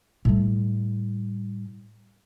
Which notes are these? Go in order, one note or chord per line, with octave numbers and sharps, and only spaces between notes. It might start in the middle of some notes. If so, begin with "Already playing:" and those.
A2 G3